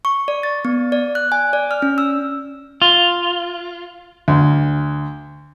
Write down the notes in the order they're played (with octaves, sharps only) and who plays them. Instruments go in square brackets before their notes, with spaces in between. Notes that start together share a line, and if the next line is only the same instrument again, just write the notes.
[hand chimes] C#6
D5
A6
B3
D5
F#6
G#5
D5
F6
C#4
E6
[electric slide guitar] F4
[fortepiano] D2